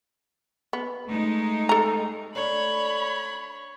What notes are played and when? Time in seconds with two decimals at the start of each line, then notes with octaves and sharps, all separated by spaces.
0.73 B3
1.08 G#3 A3 D#4
1.69 A4 A#5
2.35 A3 D4 C#5 B5